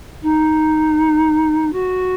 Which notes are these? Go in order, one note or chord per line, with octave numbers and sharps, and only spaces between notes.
D#4
F#4